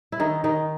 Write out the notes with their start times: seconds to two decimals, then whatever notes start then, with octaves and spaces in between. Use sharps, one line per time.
0.12 E4
0.20 D#3 D#4
0.44 D#3 D#4